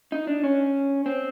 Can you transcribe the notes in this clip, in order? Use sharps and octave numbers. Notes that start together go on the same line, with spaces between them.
D#4
D4
C#4
C4